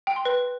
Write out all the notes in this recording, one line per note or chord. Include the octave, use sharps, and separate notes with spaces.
G5
C6
B4